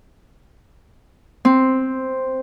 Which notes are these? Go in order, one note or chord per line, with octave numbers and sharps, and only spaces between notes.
C4